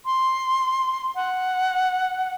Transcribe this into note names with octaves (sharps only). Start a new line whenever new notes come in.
C6
F#5